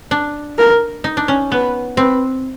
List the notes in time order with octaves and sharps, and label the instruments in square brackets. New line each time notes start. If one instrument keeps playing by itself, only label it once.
[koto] D4
[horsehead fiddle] A#4
[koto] D#4
D4
C#4
[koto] B3 [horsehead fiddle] B4
[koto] C4 [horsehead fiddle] B4